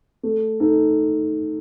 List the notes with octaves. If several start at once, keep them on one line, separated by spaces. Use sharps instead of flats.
A3
D#4 A4